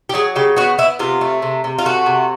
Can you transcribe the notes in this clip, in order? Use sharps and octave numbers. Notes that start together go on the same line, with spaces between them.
G4
F#3 G#4
C#3 G4
B3 F#4
B3 E4
C3 F4
A3
C3
C3
F4
A3 F#4
C3